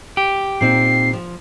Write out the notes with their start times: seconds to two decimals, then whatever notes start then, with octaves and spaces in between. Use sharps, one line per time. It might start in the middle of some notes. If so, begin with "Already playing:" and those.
0.17 G4
0.61 A#2 C4 D#4 C7
1.13 F3